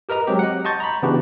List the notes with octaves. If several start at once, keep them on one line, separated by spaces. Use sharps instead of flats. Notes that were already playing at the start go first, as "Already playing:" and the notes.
G4 A#4 B4 D#5 A#5
F#3 G#3 C4 G4
D#5 F#5
D#5 A5 C6 C#6 G6 A6
A#5 B5
C#3 E3 B3 D4 F#4 G4